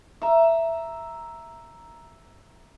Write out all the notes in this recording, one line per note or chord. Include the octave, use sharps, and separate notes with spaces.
E5 A#5